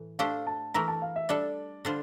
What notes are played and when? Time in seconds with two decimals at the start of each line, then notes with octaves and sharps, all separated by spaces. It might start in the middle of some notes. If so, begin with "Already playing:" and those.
Already playing: A2 E3
0.19 A3 D4 G4 C5 F5
0.47 A5
0.74 E3 A3 E4 A#4 A#5
0.88 A5
1.02 F5
1.16 E5
1.29 G3 D4 A4 D5
1.85 D3 G3 D4 F4 C5